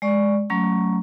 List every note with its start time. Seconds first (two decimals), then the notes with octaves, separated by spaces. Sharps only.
0.02 G#3 D5 C#6
0.50 F#3 A3 C#4 A#5 C#6